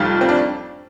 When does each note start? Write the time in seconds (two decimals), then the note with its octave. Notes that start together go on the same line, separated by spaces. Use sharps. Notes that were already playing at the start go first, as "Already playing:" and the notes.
Already playing: F1 F2 D#3 G3 F4
0.21 C4
0.29 D4